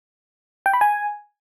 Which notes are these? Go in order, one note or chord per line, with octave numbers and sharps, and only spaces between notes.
G5
B5
G#5